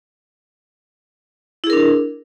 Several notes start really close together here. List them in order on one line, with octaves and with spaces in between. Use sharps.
E4 G#4 A#4 D4